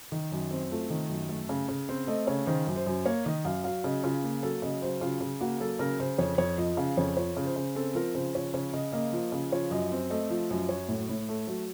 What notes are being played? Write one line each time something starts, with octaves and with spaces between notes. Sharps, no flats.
D#3
F#2
C4
A3 F4
D#3
F#2
A3 A4
C#3
C#3
C4 C5
A3 D#5
C#3 C#5
D#3 C5
F#2
C5
F#2
A#3 C#5
D#3 D#5
F#2 F5
F#3 F5
C#3 D#5
C#3 F4
A#3
F#3 A4
C#3 D#5
F#3 C5
C#3 F4
C#3
A#3 F#4
F#3 A4
C#3 A#4
C#3 C5
F2 C#5
F2 C#5
F3 D#5
C#3 F5
F2 C#5
F3 C#5
C#3
C5
C#3
C4 A4
F3 A#4
C#3 C5
F3 C#5
C#3 C#5
C#3 D#5
A#3 D#5
F3
C#3
F3 C#5
F#2 D#5
C4
A3 D#5
F3
F#2
F#3 C#5
A2
A2
A3
F#3